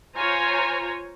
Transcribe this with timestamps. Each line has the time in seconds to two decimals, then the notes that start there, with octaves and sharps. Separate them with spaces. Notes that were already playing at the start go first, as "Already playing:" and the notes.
0.16 F4 C5 C#5 G#5 A#5